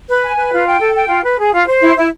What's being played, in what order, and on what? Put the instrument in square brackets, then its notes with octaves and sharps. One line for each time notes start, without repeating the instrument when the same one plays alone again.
[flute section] B4
G#5
B4
F4
G5
A4
G5
F4
B4
G#4
F4
C5
E4
E4